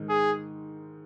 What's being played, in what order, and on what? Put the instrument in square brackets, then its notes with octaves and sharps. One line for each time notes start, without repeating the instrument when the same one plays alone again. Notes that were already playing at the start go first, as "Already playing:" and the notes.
Already playing: [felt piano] G#2 D#3 G#3
[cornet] G#4